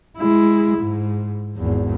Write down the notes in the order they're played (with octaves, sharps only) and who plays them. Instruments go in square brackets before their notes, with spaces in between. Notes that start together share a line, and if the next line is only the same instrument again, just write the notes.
[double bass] G#3 E4
G#2
G#1 E2